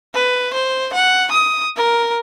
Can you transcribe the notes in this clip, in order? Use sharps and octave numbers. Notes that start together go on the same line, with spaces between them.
B4
C5
F#5
D#6
A#4